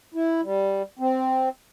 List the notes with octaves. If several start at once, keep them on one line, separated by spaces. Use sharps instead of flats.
E4
G3
C4